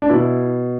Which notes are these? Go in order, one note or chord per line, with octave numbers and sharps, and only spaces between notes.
D4
B2 E4